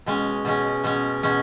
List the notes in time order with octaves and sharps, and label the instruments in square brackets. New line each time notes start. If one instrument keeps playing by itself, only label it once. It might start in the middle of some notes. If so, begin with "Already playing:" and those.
[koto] B2 G#3 C#4
B2 G#3 C#4
B2 G#3 C#4
B2 G#3 C#4